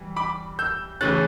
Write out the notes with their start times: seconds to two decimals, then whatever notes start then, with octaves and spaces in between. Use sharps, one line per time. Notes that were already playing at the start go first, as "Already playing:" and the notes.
Already playing: E3 G3
0.16 B5 D6
0.59 E6 G6
1.01 C#3 E3 A3 C#4 F#6 A6